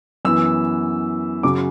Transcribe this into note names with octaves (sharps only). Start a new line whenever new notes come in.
F#2 E3 B3 E6
F#2 C#3 F#3 D6